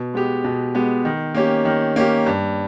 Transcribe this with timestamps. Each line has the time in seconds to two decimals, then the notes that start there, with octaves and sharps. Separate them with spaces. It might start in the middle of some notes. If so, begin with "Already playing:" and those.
Already playing: B2
0.13 G#3 B3 G4
0.44 B2
0.74 G#3 B3 G4
1.05 D#3
1.35 A#3 C#4 G4
1.65 D#3
1.96 A#3 C#4 G4
2.26 G2